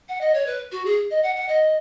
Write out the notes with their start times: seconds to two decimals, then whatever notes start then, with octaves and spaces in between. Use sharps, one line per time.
0.09 F#5
0.21 D#5
0.34 C#5
0.46 B4
0.72 F#4
0.86 G#4
1.11 D#5
1.23 F#5
1.36 F#5
1.48 D#5